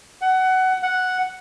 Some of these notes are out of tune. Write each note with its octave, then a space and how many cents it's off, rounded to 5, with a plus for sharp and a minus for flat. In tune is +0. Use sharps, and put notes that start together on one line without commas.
F#5 +20
F#5 +0